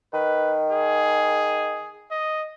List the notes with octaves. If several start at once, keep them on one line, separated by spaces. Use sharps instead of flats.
D#3 B4
G#4
D#5